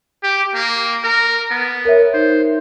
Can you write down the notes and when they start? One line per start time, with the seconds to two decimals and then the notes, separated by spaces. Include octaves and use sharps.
0.23 G4
0.55 A#3
1.04 A#4
1.51 B3
1.85 A#4 C#5 E5
2.14 D#4 C5